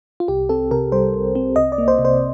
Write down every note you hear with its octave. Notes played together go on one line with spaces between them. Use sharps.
F4
C2 G4
C4 A4
C3 A#4
G3 C5
C2
C4
C2 D#5
D5
A#3
C5
C3
C5